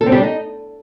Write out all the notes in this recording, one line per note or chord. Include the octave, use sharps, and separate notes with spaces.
A4
C4
G3
D4
D#4